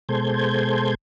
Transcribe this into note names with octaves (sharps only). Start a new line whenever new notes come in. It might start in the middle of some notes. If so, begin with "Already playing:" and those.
B2 G#3 A4 C5 G6 G#6